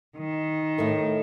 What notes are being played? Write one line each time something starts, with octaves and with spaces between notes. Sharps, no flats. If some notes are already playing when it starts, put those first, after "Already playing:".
D#3
A2 A3 D#4 A#4